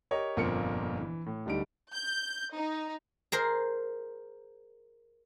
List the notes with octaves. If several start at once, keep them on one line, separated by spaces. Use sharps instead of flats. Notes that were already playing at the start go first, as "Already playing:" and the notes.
G4 A#4 C#5 D#5
G1 F2 A#2 A#3 C4 C#7
E3
A2
D1 D3 G3 D#4 D7
G6
D#4
G#4 A#4 C5